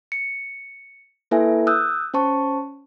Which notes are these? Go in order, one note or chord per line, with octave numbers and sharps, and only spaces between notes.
C#7
A#3 E4 A4 B4 E5 G#5
D#6 E6 F#6 G6
C#4 C5 A5 C#6